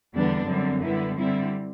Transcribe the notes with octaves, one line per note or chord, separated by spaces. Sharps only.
E2 D3 G3 B3 D4
F#2 D3 G3 C4
D3 G3 B3 E4
D3 G3 C4 E4